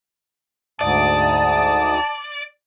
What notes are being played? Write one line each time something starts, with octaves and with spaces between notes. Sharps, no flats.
D2 G#2 D5 A5 D#6